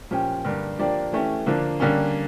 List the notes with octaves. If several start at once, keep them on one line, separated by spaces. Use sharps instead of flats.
A#2 F3 C#4 G4
G2 D3 G3 A#3
F3 A#3 D4 G4 D5
E3 A3 C#4 G4
D3 F3 A#3 D4
D3 G3 A#3 C#4